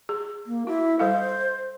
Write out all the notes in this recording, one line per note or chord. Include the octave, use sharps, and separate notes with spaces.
G#4
A#3
E4 F#4
G3 A4 C5 F5